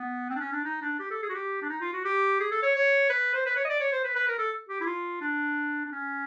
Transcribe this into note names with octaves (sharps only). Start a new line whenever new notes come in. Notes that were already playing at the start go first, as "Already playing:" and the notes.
Already playing: B3
C4
D4
C#4
D4
D#4
D4
G4
A4
G#4
F#4
G4
D4
D#4
F4
F#4
G4
G#4
A4
C#5
C#5
B4
C5
B4
C#5
D#5
D5
C#5
C5
B4
B4
A#4
A4
G4
E4
F4
D4
D4
C#4